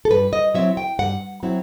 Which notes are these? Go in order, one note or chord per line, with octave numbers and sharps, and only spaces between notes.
A4
G2 B4
D#5
F#3 C4 E4 E5
G5
G2 F#5
F#3 C4 E4